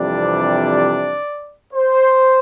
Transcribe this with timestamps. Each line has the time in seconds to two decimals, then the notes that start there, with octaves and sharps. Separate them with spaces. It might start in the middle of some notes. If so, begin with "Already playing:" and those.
Already playing: F2 C3 E3 G3 D4 D5
1.73 C5